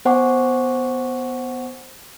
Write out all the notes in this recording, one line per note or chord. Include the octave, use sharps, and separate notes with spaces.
B3 C5 F#5 G#5 C#6 D6